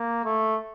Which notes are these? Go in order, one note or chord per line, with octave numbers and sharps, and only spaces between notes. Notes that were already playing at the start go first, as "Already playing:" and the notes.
Already playing: A#3
A3